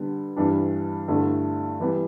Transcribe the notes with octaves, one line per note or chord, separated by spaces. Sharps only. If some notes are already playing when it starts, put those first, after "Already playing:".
Already playing: D3 G3 B3
G2 E3 G3 D4
G2 D3 A3 E4
E3 G3 B3 G4